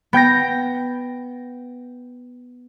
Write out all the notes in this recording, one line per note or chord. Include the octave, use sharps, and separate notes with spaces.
B3 G5 G6 A#6